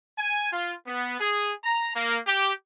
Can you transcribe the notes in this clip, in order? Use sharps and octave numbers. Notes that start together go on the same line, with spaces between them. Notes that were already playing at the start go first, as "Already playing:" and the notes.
G#5
F4
B3
G#4
A#5
A#3
G4